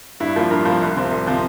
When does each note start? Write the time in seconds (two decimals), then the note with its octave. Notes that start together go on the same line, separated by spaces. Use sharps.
0.20 G2 E4
0.36 F3 A#3 F4
0.51 G2 A#4
0.65 F3 A#3
0.81 C2
0.96 C3 F3 C4
1.11 C2
1.26 C3 F3 C4